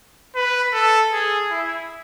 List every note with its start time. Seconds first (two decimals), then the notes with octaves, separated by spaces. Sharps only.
0.36 B4
0.73 A4
1.12 G#4
1.51 E4